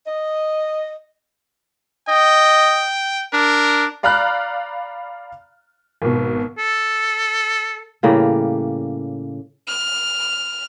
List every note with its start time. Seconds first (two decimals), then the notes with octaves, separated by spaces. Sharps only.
0.07 D#5
2.08 D#5 G5
3.33 D4 A#4
4.03 D5 F5 A#5 B5 F6 F#6
6.02 G#1 B2
6.58 A4
8.03 A2 C#3 G3 A#3
9.68 F6